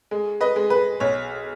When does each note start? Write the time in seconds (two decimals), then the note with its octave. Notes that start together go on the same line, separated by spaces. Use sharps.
0.11 G#3
0.41 B4 D#5
0.56 G#3
0.70 B4
1.00 B1 C#5